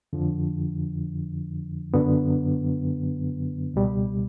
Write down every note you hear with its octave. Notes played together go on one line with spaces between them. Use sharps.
F2 D3 F3
F#2 D3 F#3 B3
C#2 B2 G3